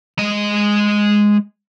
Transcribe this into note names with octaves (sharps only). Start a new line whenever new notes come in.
G#3 D#5